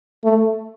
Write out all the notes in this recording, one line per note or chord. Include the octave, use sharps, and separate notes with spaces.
A3